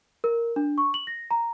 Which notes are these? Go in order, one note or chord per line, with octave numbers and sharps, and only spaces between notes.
A#4
D4
C#6
F#7
A#6
A#5